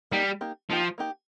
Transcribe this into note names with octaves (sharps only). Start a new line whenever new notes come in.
G3 A#3 D#4 G4
A#3 D#4 G4
F3 A#3 D#4 G4
A#3 D#4 G4